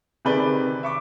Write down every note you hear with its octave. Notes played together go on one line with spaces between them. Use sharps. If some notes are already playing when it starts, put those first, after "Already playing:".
C3 D#3 G#4 B4 D5 G7
E5 C#6 D6